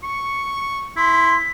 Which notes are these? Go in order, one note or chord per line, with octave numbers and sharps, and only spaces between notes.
C#6 C#7
E4 C6 B6